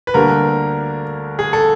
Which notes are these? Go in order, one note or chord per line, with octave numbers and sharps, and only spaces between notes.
B4
D2 D3 G3 A#3 A#4
G#4
A4